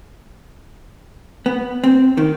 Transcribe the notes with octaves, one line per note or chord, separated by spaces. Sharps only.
B3
C4
D#3